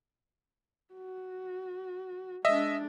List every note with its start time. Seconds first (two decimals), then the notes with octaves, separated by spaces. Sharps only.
0.94 F#4
2.45 G#3 D4 D#5 E5